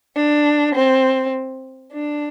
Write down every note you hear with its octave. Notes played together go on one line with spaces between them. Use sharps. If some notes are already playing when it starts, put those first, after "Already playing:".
D4
C4
D4